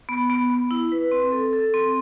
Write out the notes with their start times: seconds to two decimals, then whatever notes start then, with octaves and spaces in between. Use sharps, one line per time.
0.09 B3
0.30 B3
0.50 B3
0.71 E4
0.92 B4
1.12 C4
1.32 A4
1.53 A4
1.74 C4